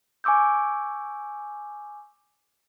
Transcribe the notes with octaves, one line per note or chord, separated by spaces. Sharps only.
G#5 C#6 D6 E6 G6